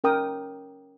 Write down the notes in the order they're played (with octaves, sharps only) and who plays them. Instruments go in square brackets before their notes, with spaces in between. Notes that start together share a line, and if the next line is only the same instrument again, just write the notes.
[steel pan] C#4 A#4 G5 D#6